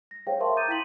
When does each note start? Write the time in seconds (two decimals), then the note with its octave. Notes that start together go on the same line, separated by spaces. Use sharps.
0.11 A#6
0.27 G#4 C5 C#5 F5 G5
0.40 A#4 E5 F5 A5 C6 C#6
0.56 A#5 D6 D#6 G6 A6 D#7
0.68 E4 G5 C6 B6 D#7 F#7